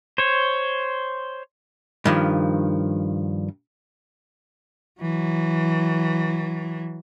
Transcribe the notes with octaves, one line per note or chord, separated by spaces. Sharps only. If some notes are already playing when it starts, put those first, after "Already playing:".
C5 C#5
G2 D#3 F3
E3 F#3